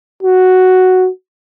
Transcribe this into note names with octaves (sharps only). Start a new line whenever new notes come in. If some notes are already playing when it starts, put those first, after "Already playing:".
F#4